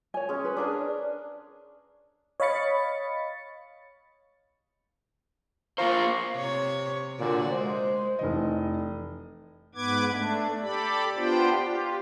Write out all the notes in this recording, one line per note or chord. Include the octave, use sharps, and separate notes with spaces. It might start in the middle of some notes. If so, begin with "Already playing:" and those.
C#5 G#5
G#3 C#4
B4
D4 G#4 A#4
C#5 D#5 F5 B5 A6 C#7
A#3 F4 C5 F5 A#5 C#6
C3 C#5
A#2 D3 F#4 D5
G#3 C5
F1 E3 D#5
G#2 B3 B4 D6 G#6
A3 D4
G4 A4 D5 B5
B3 D4 F4 G4 C5 G5
F4 G4